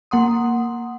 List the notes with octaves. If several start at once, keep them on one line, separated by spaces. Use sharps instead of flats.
A#3 F#5 C6 D#6